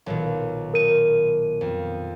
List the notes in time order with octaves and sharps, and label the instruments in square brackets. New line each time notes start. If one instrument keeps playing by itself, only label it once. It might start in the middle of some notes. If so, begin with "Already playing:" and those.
[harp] B1 A#2 D#3
[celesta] A#4 D#7
[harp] F2